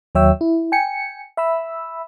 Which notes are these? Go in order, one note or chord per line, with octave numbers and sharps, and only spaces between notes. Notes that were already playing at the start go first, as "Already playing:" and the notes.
D#2 F#3 C#5 E5 G5 E6
E4
G5 G#5 C#7
E5 B5 E6